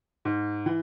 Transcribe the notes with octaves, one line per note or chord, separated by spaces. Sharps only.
G#2
E3